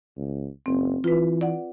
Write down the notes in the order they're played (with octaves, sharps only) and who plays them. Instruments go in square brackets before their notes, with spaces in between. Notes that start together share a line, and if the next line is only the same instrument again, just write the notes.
[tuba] C#2
[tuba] F#1 [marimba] C4
[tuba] E3 [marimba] F4 B4
[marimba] D5 F#5